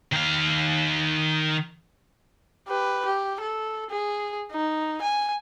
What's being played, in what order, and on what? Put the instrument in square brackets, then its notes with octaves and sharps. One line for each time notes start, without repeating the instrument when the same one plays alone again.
[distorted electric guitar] D#3 F5
[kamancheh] G4 B4
G4
A4
G#4
D#4
G#5